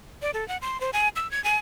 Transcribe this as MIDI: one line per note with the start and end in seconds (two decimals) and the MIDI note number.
0.22 0.31 74
0.34 0.46 69
0.48 0.57 78
0.62 0.80 84
0.81 0.91 72
0.93 1.09 80
1.16 1.29 88
1.31 1.42 92
1.44 1.56 80